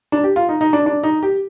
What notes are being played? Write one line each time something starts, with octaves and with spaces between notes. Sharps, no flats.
D4
G4
F4
D#4
D#4
D4
D4
D#4
G4